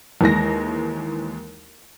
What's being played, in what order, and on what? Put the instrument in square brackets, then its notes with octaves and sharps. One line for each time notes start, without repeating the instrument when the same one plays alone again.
[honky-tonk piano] D#2 E3 G#3 A#6